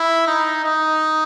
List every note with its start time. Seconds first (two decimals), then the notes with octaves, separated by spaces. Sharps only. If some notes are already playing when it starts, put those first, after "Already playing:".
Already playing: E4
0.27 D#4
0.64 D#4